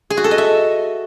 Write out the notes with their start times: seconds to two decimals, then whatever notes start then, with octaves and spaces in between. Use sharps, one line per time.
0.10 G#4
0.17 F#4
0.24 A4
0.31 D#5
0.38 E5